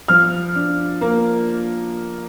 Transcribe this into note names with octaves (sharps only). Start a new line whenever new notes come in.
F3 F6
D4
A#3